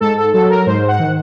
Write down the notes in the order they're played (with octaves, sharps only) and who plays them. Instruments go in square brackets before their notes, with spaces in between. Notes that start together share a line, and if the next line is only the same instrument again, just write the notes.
[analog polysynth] G#2 A4
A4
F#3 A4
A#4
G#2 C5
F#5
D#3